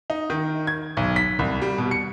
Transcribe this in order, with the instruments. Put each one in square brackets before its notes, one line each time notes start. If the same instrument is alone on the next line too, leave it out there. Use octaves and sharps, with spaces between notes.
[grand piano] D#4
D#3
G#6
B1
B6
C2
G3
B2
C#7